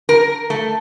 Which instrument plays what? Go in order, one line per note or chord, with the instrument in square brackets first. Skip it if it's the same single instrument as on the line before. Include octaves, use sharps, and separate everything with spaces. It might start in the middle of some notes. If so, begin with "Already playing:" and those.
[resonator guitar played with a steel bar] A#4
A3